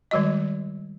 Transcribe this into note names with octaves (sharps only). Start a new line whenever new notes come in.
D#3 G3 G#3 F#4 D#5